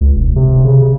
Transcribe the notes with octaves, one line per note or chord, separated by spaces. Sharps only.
C#2
E1
C3
C#3